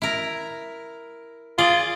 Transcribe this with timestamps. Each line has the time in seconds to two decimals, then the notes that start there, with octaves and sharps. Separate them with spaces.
0.02 E4 A#4
1.58 F4 G#4 D5